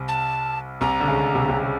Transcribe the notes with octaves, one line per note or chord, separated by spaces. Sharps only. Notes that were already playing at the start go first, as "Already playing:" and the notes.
Already playing: C2 C3
A5
C2 C3 A#5
D3
C#2 C#3
C2 C3
C#3
C2 C3
C#3